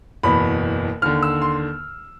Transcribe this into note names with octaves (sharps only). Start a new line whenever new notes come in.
F#1 E2 B2 B5
D#2 D3 F6
E6
C6